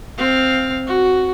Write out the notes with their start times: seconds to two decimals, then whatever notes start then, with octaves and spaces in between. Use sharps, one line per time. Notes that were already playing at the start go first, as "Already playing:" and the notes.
0.18 C4 F5
0.87 F#4